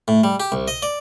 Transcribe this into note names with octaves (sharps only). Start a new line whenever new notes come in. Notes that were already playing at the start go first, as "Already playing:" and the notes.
A2
G3
G4
C2
D#5
D5